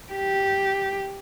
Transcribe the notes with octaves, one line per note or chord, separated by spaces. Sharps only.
G4